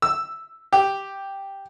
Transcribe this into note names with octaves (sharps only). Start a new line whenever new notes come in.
E6
G4